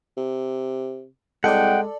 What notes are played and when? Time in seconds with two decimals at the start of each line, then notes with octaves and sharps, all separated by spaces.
0.17 C3
1.44 C2 G#3 A4 D5 F#5 G5